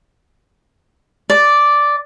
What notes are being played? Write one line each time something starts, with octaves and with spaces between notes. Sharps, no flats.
D5